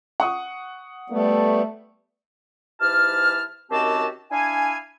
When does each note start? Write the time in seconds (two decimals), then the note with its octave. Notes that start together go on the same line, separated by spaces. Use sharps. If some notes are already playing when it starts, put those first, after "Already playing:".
0.20 F#5 C#6 D#6
1.10 G3 A3 B3
2.80 G#2 E3 E4 G4 A5 F6
3.71 F#2 D#3 C4 F#4 G4 A5
4.30 D4 E4 F5 G#5